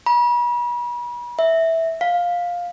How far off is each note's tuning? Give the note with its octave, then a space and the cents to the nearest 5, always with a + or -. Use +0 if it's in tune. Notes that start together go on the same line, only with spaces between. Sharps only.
B5 -40
E5 -10
F5 +10